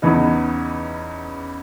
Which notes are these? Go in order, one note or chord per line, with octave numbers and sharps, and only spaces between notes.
E2 C#3 E3 B3 D#4